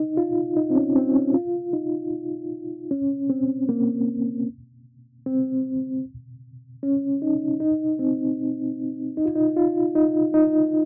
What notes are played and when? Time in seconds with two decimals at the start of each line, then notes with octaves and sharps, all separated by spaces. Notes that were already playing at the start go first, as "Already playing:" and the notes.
Already playing: D#4
0.17 F4
0.57 D#4
0.70 C4
0.76 C#4
0.96 C4
1.15 C#4
1.34 F4
1.73 D#4
2.91 C#4
3.30 C4
3.69 A#3
5.26 C4
6.83 C#4
7.22 D#4
7.60 D#4
7.99 C4
9.17 D#4
9.26 F4
9.36 D#4
9.56 F4
9.95 D#4
10.34 D#4